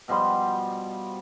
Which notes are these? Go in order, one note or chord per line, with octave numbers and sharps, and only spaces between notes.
B2 F3 G3 C6